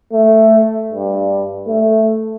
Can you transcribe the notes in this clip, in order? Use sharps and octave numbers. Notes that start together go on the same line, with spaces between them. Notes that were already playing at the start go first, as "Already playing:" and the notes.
A3
G2
A3